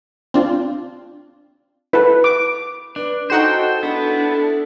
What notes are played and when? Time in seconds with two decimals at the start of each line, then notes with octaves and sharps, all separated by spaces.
0.34 C4 D4 F4
1.93 E4 F#4 A4 B4
2.24 D6
2.96 D4 B4
3.30 D#4 F#4 A4 C5 G5 E7
3.83 B3 D4 E4 A4